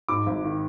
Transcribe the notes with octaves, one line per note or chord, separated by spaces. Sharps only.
G#2 D6
G#1
D#3